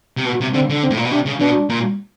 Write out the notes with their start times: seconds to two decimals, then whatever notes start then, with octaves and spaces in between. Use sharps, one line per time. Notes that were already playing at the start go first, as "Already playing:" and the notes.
0.17 C3
0.26 B2 B3
0.41 C3
0.54 D3 C4
0.70 D3
0.83 C4
0.91 A2
0.97 A#2
1.05 B2
1.12 C3 D4
1.26 C#3
1.40 B2 D4
1.70 A#2